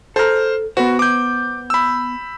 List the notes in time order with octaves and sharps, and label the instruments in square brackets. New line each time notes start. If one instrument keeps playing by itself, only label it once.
[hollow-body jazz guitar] A4 A#5 [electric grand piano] C5 F6
[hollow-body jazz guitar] B3 B4 C5 [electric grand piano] F#4
[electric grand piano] D6 G6
B5 E6